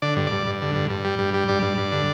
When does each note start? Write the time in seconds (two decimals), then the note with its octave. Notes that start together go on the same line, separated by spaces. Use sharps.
0.02 D3 D5
0.17 G2
0.27 D5
0.32 G2
0.47 G2
0.61 D3
0.75 G2
0.89 G2
1.05 G3
1.19 G2
1.34 G3
1.48 G2 D5
1.63 G2
1.78 G2
1.92 D3